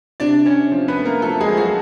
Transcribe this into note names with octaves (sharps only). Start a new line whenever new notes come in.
C3 D4 D5
C3 C#4 C#5
F3
B3 B4
A3
A#3 A#4
F3 A3 A4
G#3 G#4
F3
F#3 F#4